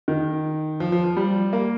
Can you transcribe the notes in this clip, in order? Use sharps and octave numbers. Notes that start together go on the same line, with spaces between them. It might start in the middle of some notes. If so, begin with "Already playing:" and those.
D#3
F3
F3
F3
G3
A#3